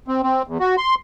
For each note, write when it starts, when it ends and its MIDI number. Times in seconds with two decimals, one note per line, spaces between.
0.08 0.22 60
0.23 0.42 60
0.47 0.58 40
0.60 0.76 66
0.77 0.95 84